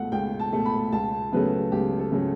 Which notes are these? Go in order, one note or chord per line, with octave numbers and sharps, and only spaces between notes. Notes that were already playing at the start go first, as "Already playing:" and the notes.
Already playing: C#2 B2 A3 F#5
C#2 G5
A5
B2 A3
B5
C#2 A5
C#3 F#3 A3 B4
C#2 G4
A4
C#3 F#3 A3